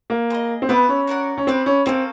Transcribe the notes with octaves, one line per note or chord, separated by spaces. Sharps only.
A#3
G#4 C5 D#5
C4
B3 G4 B4 E5
C#4
F#4 A#4 D5 F#5
C#4
C4 G4 B4 D5
C#4
A#3 C4 C#4 F#4 A4